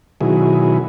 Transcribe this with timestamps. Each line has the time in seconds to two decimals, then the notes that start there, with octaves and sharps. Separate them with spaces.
0.21 B2 D#3 F#3 E4 G#4